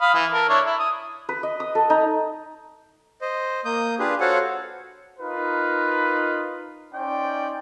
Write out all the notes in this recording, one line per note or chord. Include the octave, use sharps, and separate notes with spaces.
F5 B5 D#6
E3
A4 A#4
D4 E4 C#5
E4
D#6
B4
D#5
D#6
A4
D#4
C5 D#5
A#3 D#6 G6
D4 F4 G4 G#4 B4
F#4 A4 C5 C#5 F5 F#5
D#4 F4 A#4 B4
C#4 D#4 C5 D5 G5